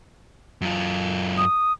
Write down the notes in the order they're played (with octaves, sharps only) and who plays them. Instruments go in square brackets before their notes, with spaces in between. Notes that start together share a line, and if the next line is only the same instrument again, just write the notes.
[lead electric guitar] F#2 F4
[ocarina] D#6